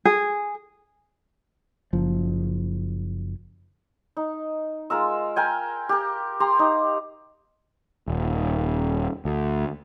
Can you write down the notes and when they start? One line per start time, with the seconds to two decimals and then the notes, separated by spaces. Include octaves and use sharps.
0.05 G#4
1.93 F#1 F3
4.17 D#4
4.90 G#3 F4 A#4 E6
5.36 A#4 G5 G#5
5.89 G4 A#4
6.40 G4 A#5 C6
6.59 D#4
8.08 D#1
9.25 D2